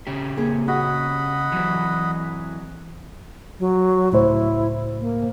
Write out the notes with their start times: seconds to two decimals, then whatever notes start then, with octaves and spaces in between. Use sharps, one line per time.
0.07 C#3 C#4 G4
0.37 A#3 C4 G#4
0.68 F#4 D#5 F#5 B5
1.52 E3 F#3 C4
3.60 F#3
4.12 C#2 A2 E4 C5
5.01 A#3